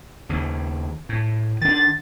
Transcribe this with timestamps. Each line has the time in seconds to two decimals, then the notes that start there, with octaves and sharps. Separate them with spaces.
0.29 D#2 C#3
1.09 A2
1.61 D#3 D4 A6